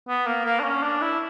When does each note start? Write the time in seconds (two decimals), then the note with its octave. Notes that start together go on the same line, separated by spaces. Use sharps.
0.09 B3
0.27 A#3
0.45 A#3
0.60 D4
0.64 C#4
0.83 D4
1.02 E4